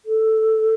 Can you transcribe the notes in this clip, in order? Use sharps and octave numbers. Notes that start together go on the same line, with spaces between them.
A4